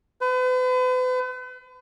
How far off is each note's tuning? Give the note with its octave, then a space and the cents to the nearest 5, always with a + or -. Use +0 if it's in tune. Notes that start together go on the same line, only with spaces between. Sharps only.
B4 +45